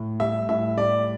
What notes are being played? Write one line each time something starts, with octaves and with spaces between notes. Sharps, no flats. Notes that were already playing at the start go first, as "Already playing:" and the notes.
Already playing: A2
G3 E5
A2 E5
G3 D5